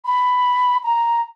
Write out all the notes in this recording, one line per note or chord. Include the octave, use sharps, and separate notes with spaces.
B5
A#5